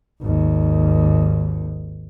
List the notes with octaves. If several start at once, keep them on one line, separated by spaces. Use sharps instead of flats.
G#1 D#2